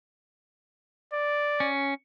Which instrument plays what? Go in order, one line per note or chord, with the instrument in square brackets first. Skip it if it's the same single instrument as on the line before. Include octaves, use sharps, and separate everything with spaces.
[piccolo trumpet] D5
[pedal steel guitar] C#4